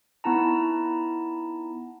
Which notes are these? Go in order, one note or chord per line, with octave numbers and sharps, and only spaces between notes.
B3 D#4 E4 A5 A#5